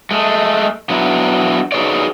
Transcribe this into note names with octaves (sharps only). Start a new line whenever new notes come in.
G#3 A3
F#3 B3 D4 E4
D#4 F#4 G#4 B4 C#5 D5